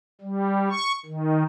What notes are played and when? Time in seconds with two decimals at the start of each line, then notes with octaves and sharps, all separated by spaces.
0.21 G3
0.70 C#6
1.05 D#3